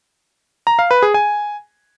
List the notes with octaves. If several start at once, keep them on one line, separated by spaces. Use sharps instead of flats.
A#5
F5
B4
G#4
G#5